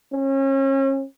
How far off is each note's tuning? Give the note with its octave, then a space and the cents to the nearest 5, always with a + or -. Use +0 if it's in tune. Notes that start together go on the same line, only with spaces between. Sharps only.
C#4 -35